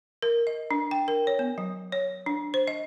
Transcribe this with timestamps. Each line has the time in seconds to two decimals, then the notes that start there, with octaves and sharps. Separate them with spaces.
0.22 A#4
0.47 D#5
0.71 D4
0.91 G5
1.08 A#4
1.27 C#5
1.39 B3
1.58 F#3
1.92 C#5
2.26 D4
2.54 C5
2.68 D#5